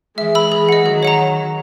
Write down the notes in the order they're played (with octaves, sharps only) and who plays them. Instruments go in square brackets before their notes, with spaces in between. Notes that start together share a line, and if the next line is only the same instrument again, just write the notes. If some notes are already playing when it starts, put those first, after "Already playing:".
[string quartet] E3 G#3 [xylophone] E5
[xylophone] B5 E6
[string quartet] E3 G#3 [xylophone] G#4
[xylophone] D#5 F#5
[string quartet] D#3 F#3 [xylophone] G#4
[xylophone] C#5 F#5 A#5